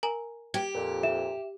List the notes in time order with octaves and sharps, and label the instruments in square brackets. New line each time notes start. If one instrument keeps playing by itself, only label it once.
[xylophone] A#4 G#5 A#5
[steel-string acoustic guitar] G4 [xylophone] G5 G#6
[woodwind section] F2 A#2
[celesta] E5 E7